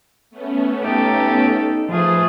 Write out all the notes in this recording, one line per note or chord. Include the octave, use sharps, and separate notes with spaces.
A3 B3 C#4
D#4 G4 A4
F3 A3 F4 G#4 B4 A5